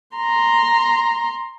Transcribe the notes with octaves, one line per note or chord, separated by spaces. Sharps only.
A#5 C6